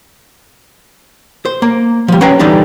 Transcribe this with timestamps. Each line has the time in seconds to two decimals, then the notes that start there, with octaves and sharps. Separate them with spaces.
1.45 C5
1.62 A#3
2.08 F3 G3
2.21 C#4 B4 C#5 F5 G5 A#5
2.39 D3 E3 G3 D4 D#4 G4